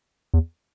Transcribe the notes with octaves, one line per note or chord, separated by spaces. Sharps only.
E2